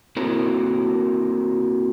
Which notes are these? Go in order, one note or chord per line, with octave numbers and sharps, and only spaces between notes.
A#3 C4 E4 F#4 A4 A#4